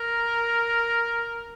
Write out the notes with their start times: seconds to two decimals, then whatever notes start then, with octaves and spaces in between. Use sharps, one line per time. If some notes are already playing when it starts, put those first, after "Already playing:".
Already playing: A#4